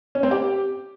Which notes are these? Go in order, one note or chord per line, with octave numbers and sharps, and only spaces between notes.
C#4
C4
G4